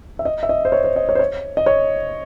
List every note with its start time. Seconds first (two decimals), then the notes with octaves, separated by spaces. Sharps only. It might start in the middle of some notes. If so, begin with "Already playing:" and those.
0.19 E5
0.25 D#5
0.43 E5
0.49 D#5
0.65 C5
0.72 C#5
0.84 C5
0.96 D#5
1.09 C#5
1.15 C5
1.19 C#5
1.57 D#5
1.66 C#5